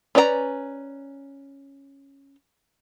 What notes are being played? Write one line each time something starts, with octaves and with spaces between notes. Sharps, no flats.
C#4 B4 D5 D#5 A#5